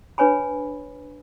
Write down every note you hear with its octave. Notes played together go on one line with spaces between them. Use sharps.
D4 B4 C#5 G#5 B5